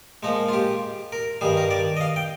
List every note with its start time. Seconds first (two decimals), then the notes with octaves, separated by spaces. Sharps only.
0.23 A#2 F3 G#3 D#4
0.49 F4
0.53 G4
1.12 A#4
1.41 G2 D#3 G3 G#4
1.57 A#4
1.71 D5
1.97 D#5
2.01 F5
2.16 G5